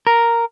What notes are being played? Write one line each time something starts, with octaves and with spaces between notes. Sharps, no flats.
A#4